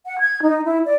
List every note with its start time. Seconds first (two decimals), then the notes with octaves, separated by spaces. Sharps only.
0.05 F#5
0.20 G#6
0.42 D#4
0.65 E4
0.86 D5